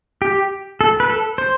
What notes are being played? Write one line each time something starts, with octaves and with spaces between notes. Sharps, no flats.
G4
A4
B4
A4
C5